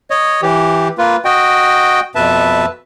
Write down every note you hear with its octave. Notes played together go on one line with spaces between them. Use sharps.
C#5 D#5
E3 G4
A#3 F4 B4
F#4 D#5 G5
F2 B2 B4 E5 A5